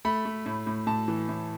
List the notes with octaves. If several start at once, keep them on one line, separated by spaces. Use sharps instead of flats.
A3 B5
A3
A2
A2
A2 A5
E3
A2